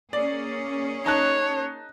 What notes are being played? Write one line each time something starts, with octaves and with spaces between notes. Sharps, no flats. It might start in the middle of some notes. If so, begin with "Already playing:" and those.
A#3 C#4 G#4 D5
D#4 C#5 A5 F#6